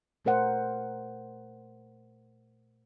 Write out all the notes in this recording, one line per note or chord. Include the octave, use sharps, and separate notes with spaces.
A#2 A3 A#4 C5 F#5